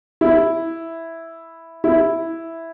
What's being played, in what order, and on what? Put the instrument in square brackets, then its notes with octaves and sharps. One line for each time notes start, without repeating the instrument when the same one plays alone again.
[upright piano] E4
E4